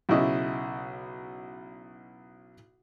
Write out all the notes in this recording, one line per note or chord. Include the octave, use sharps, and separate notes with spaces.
B1 C#3 E4 D#5